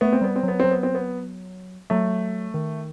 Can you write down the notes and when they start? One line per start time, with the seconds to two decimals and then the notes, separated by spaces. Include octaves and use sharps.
0.01 A3 B3
0.13 C4
0.22 G3 B3
0.36 C4
0.43 F#3 B3
0.60 F#3 C4
0.71 B3
0.83 C4
0.95 B3
1.90 F#3 A3
2.54 D#3